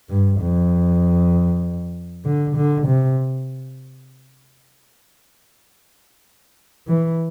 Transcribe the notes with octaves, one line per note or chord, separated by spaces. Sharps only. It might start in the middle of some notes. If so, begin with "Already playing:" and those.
G2
F2
D3
D3
C3
E3